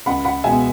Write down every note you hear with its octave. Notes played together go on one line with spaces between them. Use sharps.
C#2 F#5 B5
F#5 B5
B2 G#3 B3 E5 G#5